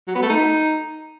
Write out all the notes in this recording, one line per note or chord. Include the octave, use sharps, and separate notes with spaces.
F#3
B3
A3
D#4